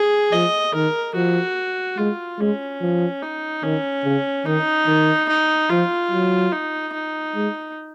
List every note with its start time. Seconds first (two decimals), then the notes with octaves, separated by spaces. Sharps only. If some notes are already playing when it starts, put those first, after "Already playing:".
Already playing: G#4
0.33 F3 D#5
0.74 D#3 A#4
1.15 F3 F#4
1.98 G#3 F4
2.39 G#3 C#4
2.81 F3
3.22 D#4
3.63 D#3 C#4
4.04 C#3
4.46 D#3 D#4
4.87 D#3
5.29 D#4
5.70 F3 F4
6.11 F#3
6.52 D#4
6.94 D#4
7.35 G#3